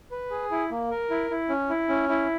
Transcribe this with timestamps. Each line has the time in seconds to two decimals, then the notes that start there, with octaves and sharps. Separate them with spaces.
0.11 B4
0.31 G#4
0.51 E4
0.71 A#3
0.90 A#4
1.10 E4
1.30 E4
1.49 C#4
1.70 E4
1.89 C#4
2.09 E4